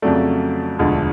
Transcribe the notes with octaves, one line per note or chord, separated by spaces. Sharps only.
F2 C#3 F#3 A3 D5
E1 D2 D3 F3 G#3